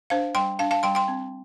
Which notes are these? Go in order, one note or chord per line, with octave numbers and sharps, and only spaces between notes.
D4 C5 F5
G3 G5 C6
D4 F5 A5
F5 A5
G3 G5 C6
G5 C6
C4